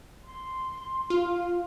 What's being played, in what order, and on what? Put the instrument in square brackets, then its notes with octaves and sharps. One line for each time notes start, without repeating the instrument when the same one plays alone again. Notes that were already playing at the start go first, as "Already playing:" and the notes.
[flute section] C6
[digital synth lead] F4